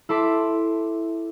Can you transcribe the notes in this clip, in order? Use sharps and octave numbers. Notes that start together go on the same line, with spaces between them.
E4 A4 C6 D6 B6